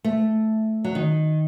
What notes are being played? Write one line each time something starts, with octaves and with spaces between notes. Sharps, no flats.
A3
F#3
D#3